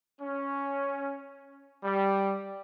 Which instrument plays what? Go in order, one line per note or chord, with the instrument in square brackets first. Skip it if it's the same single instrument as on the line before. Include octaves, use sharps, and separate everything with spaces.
[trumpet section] C#4
G3